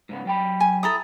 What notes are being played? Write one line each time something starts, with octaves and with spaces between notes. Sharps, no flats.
G#2 C#3 B3
F#3 G5 B5
G#5
E4 A4 A#5 D#6